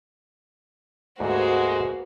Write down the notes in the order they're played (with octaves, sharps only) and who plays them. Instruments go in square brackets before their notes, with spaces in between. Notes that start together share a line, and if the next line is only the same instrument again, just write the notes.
[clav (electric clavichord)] D2 G#2 G3 [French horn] G#3 [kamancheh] A#3 B3 [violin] F#4 C5